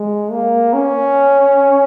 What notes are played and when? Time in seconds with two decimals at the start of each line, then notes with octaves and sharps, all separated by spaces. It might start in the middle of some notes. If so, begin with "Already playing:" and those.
Already playing: G#3
0.31 A#3
0.74 C#4